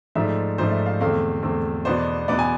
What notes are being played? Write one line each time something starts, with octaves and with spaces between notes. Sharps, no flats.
G#2 F3 A3 D4 E5
G#2 F3 A3 D4 C5
E5
F5
E2 D3 A3 C4 F5
E2 D3 A3 C4
E2 B2 B3 D4 C5
E2 B2 B3 D4 D5
G#5